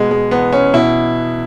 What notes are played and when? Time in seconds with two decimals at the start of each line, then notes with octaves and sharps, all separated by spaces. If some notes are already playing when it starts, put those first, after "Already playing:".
Already playing: B2 G#3
0.11 G#3
0.31 E2 B3
0.53 C#4
0.73 B2 E4